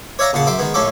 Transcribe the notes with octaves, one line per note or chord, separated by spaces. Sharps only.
C#5 D5 E5 F5 A#5
A#1 A#2 C#3 F#5 A5
F#2 E5 C6 D6
D#3 G#3 B3
A#1 A2 C#4 A4 D6